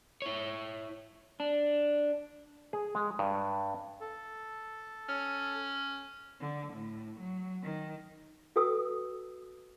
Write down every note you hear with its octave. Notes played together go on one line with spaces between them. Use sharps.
E4 C#5
D4
G#4
G#3
G2
A4
C#4
D3
A2
F#3
D#3
F#4 A4 B4 G5 D#6 E6